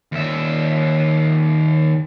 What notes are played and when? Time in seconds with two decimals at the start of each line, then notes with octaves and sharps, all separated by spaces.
0.12 D#2 E5